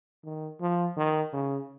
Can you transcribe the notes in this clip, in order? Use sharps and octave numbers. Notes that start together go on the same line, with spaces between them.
D#3
F3
D#3
C#3